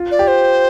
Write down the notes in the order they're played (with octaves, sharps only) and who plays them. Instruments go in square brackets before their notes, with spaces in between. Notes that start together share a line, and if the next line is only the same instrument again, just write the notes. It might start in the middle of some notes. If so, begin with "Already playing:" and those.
Already playing: [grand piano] F4
[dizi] D5
[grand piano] G4
[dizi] C5